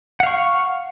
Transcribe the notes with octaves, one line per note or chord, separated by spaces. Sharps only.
F5 F#5 C#6